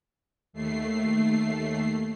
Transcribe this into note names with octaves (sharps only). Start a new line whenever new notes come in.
D#2 A3 C7